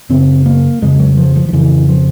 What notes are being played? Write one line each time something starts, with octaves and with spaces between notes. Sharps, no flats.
F#2 C#3 C4
A#3
F2 C#3 G#3
F#3
F3
F3
D#3
F2 C#3 E3
F3